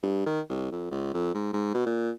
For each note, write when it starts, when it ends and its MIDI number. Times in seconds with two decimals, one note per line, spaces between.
0.02 0.23 43
0.26 0.41 51
0.49 0.69 36
0.71 0.88 41
0.91 1.12 37
1.14 1.33 41
1.34 1.53 44
1.53 1.70 44
1.74 1.83 47
1.86 2.10 46